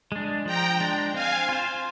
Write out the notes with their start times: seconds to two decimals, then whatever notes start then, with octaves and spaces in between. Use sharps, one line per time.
0.12 G#3 D4
0.46 F3 G5 A#5
0.80 G#3 D4
1.14 C4 F5 G#5
1.49 F4 C5